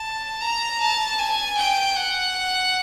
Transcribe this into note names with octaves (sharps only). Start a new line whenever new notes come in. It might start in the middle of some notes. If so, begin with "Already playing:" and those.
Already playing: A5
A#5
A5
G#5
G5
F#5